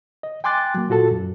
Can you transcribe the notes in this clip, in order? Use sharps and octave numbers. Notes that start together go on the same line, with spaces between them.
D#5
G5 G#5 C6 D6 F#6 A6
F#3 A#3
A#2 F4 F#4 A4 A5
F#2